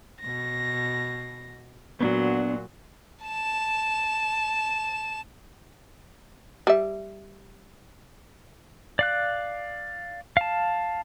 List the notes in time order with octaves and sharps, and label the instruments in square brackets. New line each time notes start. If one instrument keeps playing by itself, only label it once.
[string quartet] B2 A#6
[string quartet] A#2 F#3 [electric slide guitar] B3 D4 F#4
[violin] A5 E7
[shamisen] G3 E5
[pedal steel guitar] D5 F5 F#6
F5 A5